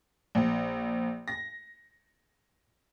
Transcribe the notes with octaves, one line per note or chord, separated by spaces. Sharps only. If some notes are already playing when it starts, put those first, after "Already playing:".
A#1
A#6